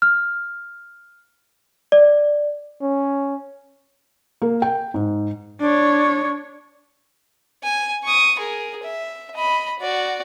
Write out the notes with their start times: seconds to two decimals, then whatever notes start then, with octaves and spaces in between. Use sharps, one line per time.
0.02 F6
1.92 D5
2.81 C#4
4.42 A#3
4.62 G5
4.94 G#2
5.61 D4 C#5
7.63 G#5
8.03 C#6 D#6
8.39 G#4 A#4
8.83 E5
9.35 D#5 B5
9.79 F#4 D5